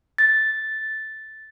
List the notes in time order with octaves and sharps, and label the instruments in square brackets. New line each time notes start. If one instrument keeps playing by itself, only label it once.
[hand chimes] A6